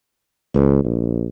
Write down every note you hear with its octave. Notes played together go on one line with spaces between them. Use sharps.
C#2
A#1